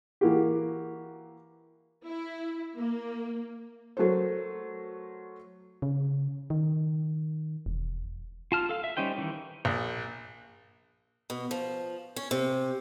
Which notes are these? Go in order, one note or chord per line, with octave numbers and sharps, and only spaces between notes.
E3 A#3 F#4 G4
E4
A#3
F#3 A3 F#4 A#4 C5
C#3
D#3
E1
F4 A5 F6
A4 F5
E5
G3 C#4 D#4 C5 G5
D#3 E3
A#1
B2
F3
C#4
C3